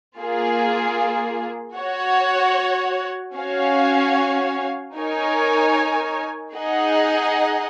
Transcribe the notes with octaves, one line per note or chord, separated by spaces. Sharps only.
A#3 F4 G#4
F#4 C#5 F#5
C#4 F#4 C#5 F5 G#5
D#4 A#4 C#5 G#5
D#4 G#4 D#5 F#5